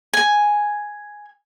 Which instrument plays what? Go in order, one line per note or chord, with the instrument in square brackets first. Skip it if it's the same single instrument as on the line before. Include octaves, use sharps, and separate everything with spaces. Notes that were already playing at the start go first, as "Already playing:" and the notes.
[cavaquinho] G#5